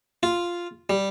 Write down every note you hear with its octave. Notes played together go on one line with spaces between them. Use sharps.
F4
G3